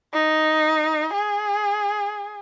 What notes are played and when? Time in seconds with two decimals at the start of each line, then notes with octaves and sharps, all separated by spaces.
0.14 D#4
1.14 G#4